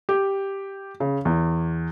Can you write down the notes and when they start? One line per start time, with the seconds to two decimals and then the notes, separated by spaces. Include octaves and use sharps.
0.09 G4
1.00 C#3
1.25 E2